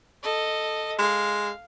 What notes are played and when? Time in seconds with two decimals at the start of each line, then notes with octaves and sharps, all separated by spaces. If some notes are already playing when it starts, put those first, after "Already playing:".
0.23 A4 D#5
0.99 G#3 F5